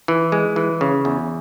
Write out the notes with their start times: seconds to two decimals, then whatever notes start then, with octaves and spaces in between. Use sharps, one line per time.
0.08 E3
0.32 G#3
0.56 E3
0.81 C#3
1.05 E2